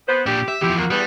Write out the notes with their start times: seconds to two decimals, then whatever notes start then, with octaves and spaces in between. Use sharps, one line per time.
0.07 B3 C5
0.26 A#2 D4 G4
0.48 E5
0.61 E2 F3 E4 G4
0.78 A#3 F#4
0.90 E2 D3 G3 B3